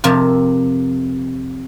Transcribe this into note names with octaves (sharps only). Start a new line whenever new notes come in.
F2 C3 A#4 A5